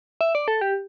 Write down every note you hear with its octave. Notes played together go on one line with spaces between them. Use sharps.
E5
D5
A4
G4